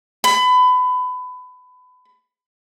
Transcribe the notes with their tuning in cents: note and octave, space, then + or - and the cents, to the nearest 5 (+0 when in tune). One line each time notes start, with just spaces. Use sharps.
B5 +25